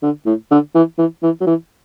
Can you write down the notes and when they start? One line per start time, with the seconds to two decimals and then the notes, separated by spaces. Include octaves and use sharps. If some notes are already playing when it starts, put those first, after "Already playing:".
0.03 D3
0.26 A2
0.51 D3
0.75 E3
0.98 E3
1.23 E3
1.41 F#3
1.47 E3